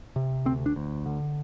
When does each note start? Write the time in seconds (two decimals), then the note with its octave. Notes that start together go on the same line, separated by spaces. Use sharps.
0.16 C3
0.45 D2 C4
0.66 D4
0.76 D2
1.06 D3